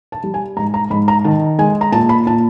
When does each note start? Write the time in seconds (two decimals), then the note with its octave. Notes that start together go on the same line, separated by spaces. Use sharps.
0.12 A5
0.23 G3
0.34 G#5
0.57 G#2 A#5
0.74 A#5
0.90 G#2 B5
1.08 A#5
1.24 D#3 A5
1.59 G#3 G#5
1.81 A#5
1.92 A#2 A5
2.09 B5
2.27 A#2 A5